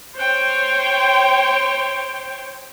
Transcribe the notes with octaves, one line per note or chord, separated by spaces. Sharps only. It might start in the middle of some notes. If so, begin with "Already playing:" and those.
C5 C#5 G5